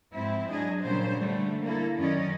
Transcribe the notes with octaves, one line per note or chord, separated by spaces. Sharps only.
G#2 F3 C4 E4
F#3 D4 G#4 D#5
A#2 C#3 F#3 G3 D4 C5
D3 G3 A3
G3 A#3 E4 A4
F#2 D#3 C#4 D5 D#5